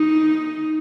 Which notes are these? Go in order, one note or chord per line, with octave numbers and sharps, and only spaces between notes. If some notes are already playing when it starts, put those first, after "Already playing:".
Already playing: D#4